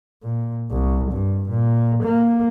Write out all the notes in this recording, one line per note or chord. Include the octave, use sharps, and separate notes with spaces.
A#2
C2
G2
A#2
A#3